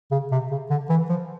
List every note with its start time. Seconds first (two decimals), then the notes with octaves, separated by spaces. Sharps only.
0.11 C#3
0.32 C3
0.51 C#3
0.70 D3
0.89 E3
1.09 F3